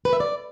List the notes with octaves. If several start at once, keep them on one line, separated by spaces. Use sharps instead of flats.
B4
E5
D5